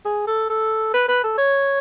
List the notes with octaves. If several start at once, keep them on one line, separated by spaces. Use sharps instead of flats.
G#4
A4
A4
B4
B4
A4
C#5